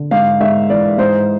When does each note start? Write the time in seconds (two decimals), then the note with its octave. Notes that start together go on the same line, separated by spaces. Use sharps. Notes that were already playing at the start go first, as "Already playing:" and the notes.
Already playing: D3
0.11 G#2 F5
0.41 G#2 E5
0.70 E3 D5
0.98 G#2 C5